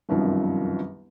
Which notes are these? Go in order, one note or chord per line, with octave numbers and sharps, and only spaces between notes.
G1 C2 F#2 D#3 F3